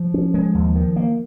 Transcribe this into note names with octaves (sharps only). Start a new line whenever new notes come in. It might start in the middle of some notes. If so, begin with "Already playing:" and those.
Already playing: F3
C#4
G#3
D#2
D#3
A#3